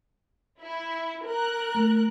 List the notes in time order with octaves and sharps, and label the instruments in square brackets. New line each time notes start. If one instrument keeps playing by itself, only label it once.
[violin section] E4
A#4 F#6
[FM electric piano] A3